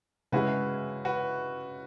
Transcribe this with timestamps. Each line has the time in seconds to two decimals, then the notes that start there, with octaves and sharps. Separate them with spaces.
0.32 C#3 G#3 E4 F#4 G#4 B4
1.05 F#4 B4